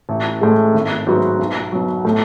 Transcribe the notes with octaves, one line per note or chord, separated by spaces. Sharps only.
A1
A2 G#3
G#1
G#2 F#3 B3 F#4
B1
B2 F#3
A2